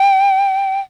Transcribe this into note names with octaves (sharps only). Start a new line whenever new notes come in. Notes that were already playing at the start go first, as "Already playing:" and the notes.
Already playing: G5